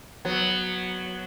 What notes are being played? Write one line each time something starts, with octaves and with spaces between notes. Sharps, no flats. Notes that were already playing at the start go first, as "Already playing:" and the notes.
F#3 B3